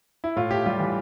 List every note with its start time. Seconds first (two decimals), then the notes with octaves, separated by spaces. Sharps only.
0.24 E4
0.36 A2 F4
0.51 A2 G4
0.66 G3 F4
0.80 E3